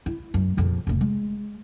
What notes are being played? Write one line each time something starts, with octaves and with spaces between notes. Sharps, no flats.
E4
F#2
A#1 F2
F1 A#2
G#3